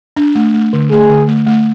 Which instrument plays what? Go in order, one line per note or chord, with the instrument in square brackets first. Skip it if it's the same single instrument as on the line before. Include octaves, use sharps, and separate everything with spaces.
[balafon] D4
A3
A3
D3
[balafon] A3 [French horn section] G#4
[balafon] D3
A3
A3